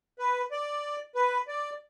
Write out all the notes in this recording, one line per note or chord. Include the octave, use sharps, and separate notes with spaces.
B4
D5
B4
D5